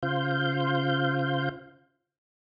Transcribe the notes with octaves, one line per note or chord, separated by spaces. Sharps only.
C#3 F4 C5 F5 G6